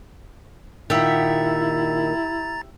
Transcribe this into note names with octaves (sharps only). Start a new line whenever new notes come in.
A#2 D#3 E4 G4 E5 F#5 A#5 A6